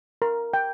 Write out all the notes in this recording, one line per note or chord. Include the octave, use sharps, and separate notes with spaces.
A#4
G5